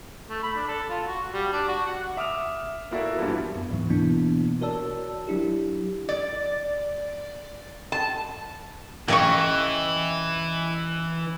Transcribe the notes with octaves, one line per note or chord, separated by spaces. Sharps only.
A3
B5
D4
A4
F4
F#4
G3
D4
F#4
F#5
E5 D6 D#6 F6 F7
A#3 E4 F#4 A4 D5 E5
G2 E3 F3 G3 B3
F#2 B3
D2 G#2 E3 F#3
B2 E3 A#3 B3 D4 E4
F#4 A#4 C#5 D5 A5 E6
F#3 D4 E4 G4
D5
A5
C#3 E3 D#5 E5 G5 C#6